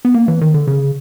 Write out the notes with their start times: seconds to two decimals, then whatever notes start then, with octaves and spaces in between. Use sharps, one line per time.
0.05 B3
0.14 A#3
0.28 E3
0.41 D#3
0.54 D3
0.67 C#3